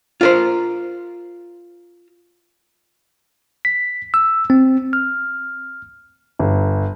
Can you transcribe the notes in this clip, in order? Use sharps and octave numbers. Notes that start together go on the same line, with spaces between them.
F4 A#4 C5
B6
E6
C4
F6
G1